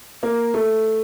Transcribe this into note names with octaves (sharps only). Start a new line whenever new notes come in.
A#3
A3